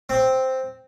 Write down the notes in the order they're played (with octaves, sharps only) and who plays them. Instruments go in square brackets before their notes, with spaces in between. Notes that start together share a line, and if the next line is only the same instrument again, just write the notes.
[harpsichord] C4